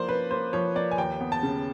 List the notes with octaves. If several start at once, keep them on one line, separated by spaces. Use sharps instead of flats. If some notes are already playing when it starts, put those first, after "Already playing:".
Already playing: F3 A#3 C5 D5
C#4 B4
A#3 C5
F3 C#5
A#3 D5
G#5
D#2 G5
B3
A5
C#3